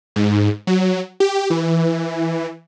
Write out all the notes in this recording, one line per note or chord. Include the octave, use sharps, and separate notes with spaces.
G#2
F#3
G4
E3